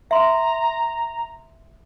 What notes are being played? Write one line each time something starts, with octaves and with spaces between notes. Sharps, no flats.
E5 A#5 C6